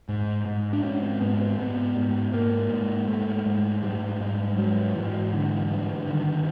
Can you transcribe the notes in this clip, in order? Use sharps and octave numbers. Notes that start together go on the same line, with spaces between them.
G#2
G#2
D4
G#2 C#4
C4
G#2 B3
C4
G#2 B3
G#2
G#2 A#3
G#2
G#2 A3
G#2
G#2 G3
G#2
G#2 F#3
G#2 E3
D3 E3
G2
D3 D#3